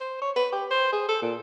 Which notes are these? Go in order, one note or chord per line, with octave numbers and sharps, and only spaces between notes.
C5
C#5
B4
G4
C5
G#4
A4
A#2